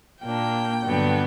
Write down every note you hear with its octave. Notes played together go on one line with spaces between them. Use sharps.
A#2 A#3 D4 G5
G2 D3 F#3 B3